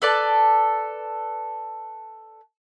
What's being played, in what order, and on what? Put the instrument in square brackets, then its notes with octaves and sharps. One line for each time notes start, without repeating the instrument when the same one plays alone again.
[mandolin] A4 B4 D5 A5